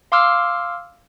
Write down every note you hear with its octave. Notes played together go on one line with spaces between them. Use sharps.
F5 C6 D6 E6 F6